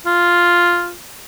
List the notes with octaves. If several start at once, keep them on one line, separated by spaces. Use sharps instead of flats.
F4